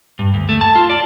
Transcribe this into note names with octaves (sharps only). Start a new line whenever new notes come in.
G2
D2
A3
A5
F4
D5